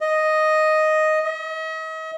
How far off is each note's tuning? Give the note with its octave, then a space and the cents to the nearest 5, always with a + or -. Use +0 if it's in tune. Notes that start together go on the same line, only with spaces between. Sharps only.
D#5 +0
D#5 +40